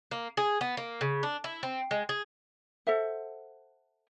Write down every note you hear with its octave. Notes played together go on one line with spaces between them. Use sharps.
A#3
G#4
B3
A#3
C#3
D4
E4
C4
G#3
G#4
A4 C5 E5 F#5